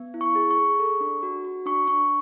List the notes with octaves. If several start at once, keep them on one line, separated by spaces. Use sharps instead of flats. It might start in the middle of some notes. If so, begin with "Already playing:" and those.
Already playing: B3
E4
C#6
G#4
C#6
G#4
A4
D4
F#4
F#4
D4 C#6
D4 C#6